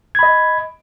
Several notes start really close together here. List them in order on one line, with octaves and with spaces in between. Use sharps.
G#6 B5 D#5